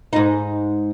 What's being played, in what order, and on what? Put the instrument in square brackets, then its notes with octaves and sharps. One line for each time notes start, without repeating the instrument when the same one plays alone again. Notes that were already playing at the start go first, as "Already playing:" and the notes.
[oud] G#2 D#4